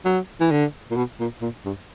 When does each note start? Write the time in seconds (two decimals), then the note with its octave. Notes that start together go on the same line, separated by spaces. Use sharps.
0.05 F#3
0.41 E3
0.51 D3
0.91 A#2
0.96 B2
1.20 A#2
1.42 A#2
1.65 G2